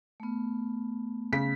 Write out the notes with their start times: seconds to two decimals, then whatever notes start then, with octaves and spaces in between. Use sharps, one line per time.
0.20 A3 B3
1.33 C#3 B6